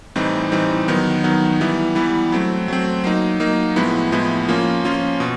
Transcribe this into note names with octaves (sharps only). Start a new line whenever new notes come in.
A2 E3 G3 C4 D#4
A2 E3 G3 C4 D#4
D#3 F#3 B3 D#4
D#3 F#3 B3 D#4
E3 G3 B3 E4
E3 G3 B3 E4
F#3 A3 C4
F#3 A3 C4
F#3 A#3 D#4
F#3 A#3 D#4
A2 F3 G#3 B3 E4
A2 F3 G#3 B3 E4
F3 A#3 C#4 F4
F3 A#3 C#4 F4
B2